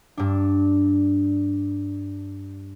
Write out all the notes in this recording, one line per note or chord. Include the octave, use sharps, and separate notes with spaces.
G2 D4